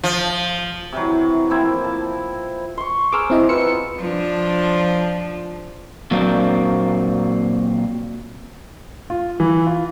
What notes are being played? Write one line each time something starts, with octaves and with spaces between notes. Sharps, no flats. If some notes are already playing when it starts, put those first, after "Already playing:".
F3
C3 E3 F#3
F3 A#3 C4 E4
A5
C6 C#6
G#4 C5 A#5 D6 E6 F6
C4 E4 D#5
F4 B4 E6 C#7
B3
F3 D4
A#2 F#3 A#3 C4 D4
F4
E3
F4